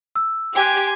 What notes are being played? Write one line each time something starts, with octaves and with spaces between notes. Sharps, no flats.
E6
G4 G5 G#5 C6 F#6